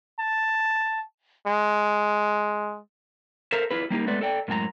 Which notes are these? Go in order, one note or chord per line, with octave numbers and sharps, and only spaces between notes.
A5
G#3
A4 A#4 C5 E5 F5 A#5
E4 F4 G#4 B4
G3 A#3 D#4 G4
G#3 A3 B3 B4 D5
A4 D5 G5
F#2 A2 G#3 G#5 A#5